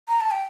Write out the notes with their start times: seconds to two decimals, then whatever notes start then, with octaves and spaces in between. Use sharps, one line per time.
0.08 A#5
0.20 A5
0.31 G5